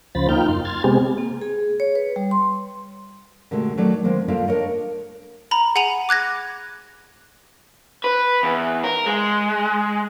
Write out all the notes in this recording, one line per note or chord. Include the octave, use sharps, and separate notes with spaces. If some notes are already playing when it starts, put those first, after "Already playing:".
D2 C#3 F3 C5 B5 A6
A#3 D#4 F4 G5 F6 G6
F#2 C6
C6 F6 G#6 A6
C3 G#3 B3 C4 G4 G#4
A#3
G#4
C#5
B4
G3
C6
A#2 D3 G#3 A3 F#4 G4
D#3 F#3 A3 D#4 D5
D#3 G#3 A#3 C4
G3 A#3 D4 F4 A4 F5
D4 A4 A#4 C#5 D#5
A#5 B5
G#4 F#5 G#5 B5 D#7 F7
D6 F#6 G#6 A#6
B4
E2
A#4
G#3